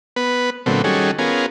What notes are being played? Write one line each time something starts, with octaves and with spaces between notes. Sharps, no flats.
B3 B4
A#2 D3 F#3 A3 B3 C4
D#3 G3 C#4 F#4 G#4 A4
B3 C#4 F4 G#4 A#4